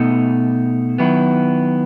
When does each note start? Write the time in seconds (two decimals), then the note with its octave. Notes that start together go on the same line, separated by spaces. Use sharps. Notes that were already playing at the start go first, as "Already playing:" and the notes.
Already playing: B2 A3 D#4
0.98 D#3 F#3 B3 E4